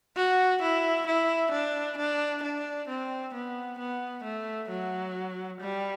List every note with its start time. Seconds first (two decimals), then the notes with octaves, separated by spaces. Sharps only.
0.16 F#4
0.62 E4
1.07 E4
1.52 D4
1.97 D4
2.43 D4
2.88 C4
3.34 B3
3.79 B3
4.24 A3
4.70 F#3
5.60 G3